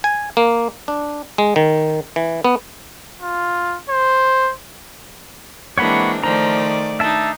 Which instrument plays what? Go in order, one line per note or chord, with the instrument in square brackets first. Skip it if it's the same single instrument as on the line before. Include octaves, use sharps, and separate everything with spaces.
[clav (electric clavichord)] G#5
A#3
D4
G#3
D#3
E3
B3
[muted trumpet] F4
C5
[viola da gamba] E3 G#3 C4 [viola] A#3 D4 [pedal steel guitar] C#5 F#5 B5
[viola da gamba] D#3 A3 D5 [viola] F3 [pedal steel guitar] A#5
[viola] D4 D#4 [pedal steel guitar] E5 A5